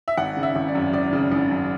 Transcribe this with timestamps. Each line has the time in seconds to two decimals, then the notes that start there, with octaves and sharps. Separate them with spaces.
0.08 E5
0.17 G#1 F#5
0.37 C#3
0.43 E5
0.56 G#1
0.68 D5
0.75 F#2
0.93 G#1 D5
1.13 C#3
1.32 G#1
1.51 F#2